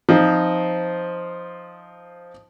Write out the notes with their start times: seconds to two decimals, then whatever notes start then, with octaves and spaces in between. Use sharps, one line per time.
0.09 F3 C4 D#4